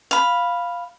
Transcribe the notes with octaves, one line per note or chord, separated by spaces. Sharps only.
F5 B5